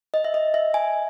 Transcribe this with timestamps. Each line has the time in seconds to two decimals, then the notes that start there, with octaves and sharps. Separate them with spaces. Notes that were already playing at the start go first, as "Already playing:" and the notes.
0.14 D#5
0.24 E5
0.34 D#5
0.54 E5
0.74 G#5